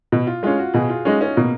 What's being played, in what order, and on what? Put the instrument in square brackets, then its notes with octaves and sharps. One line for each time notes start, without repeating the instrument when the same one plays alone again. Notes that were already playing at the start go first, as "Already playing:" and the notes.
[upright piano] B2
[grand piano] F4
[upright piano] G#3 [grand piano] F4
[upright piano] C#4
[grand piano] F#4
[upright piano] B2 [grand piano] G#4
[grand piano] F4
[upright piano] G#3 C#4 [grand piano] D#4
[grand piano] C#4
[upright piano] B2 [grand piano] A#3